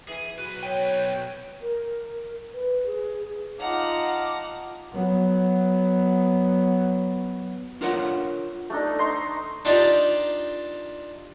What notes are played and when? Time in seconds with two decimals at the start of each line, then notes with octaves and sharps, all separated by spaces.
0.09 E3 G#4 G#5
0.38 B1 F#4 B4
0.63 C#5 G5
1.61 A#4
2.53 B4
2.86 G#4
3.59 D#4 F4 F#5 A5 A#5 D6 F6
4.91 F#3 B3
7.81 D4 F4 A#4 C#5 F#5
8.70 A3 D4 D#4
8.99 D#4 A#5 C6 C#6
9.65 D4 D#4 F4 G4 A#4 D5